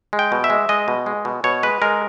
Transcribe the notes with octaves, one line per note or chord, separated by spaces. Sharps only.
G#3
G5
B2
E5
G#3
G#3 D#5
B2
G#3
B2
B2 C#5
G#3 B4
G#3 A#4